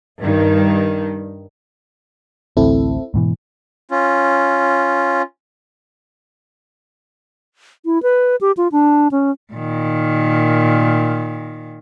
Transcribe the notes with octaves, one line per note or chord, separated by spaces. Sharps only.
G2 D#3
A1 D2 C4 E4 A4
G#2 B2 E3
C#4 F4
E4
B4
G4
F4
D4
C#4
A#2 D#3